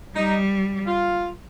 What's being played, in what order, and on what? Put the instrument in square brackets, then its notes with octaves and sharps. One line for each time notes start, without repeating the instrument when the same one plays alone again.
[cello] G3 [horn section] D#4
[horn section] F4